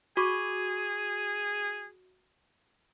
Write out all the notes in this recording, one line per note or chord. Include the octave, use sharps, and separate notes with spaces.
F#4 G#4 C#6 D6